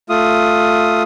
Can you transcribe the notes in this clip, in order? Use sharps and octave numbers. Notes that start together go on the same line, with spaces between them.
A3 F4 D#6